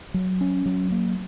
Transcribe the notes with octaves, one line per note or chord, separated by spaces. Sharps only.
F#3
C#4
F#3
A#3